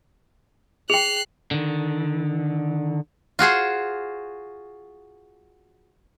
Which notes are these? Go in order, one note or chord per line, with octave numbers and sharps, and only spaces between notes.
G#4 G5 F#6 C7 F7
D3 D#3
F4 F#4 G#4 C5